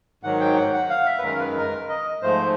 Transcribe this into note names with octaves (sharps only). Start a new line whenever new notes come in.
G#2 D#3 F#3 F#5
G5
F#5
F#5
F5
E5
B4
F#2 D#3 G#3 A#4
B4
A#4
D#5
G#2 F3 A3 C5